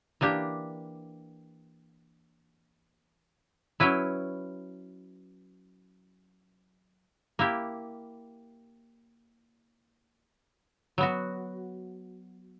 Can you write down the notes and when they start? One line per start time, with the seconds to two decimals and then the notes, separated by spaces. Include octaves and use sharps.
0.21 E3 A#3 D4 G4
3.80 F#3 C#4 E4 B4
7.39 A#3 E4 G4
10.98 F#3 B3 F#4